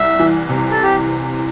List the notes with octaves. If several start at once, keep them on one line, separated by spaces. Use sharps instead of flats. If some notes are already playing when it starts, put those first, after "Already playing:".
Already playing: C2 E5
E3
C3
A4
G4